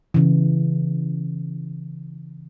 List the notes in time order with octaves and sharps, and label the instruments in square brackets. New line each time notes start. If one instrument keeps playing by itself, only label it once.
[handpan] C#3 E3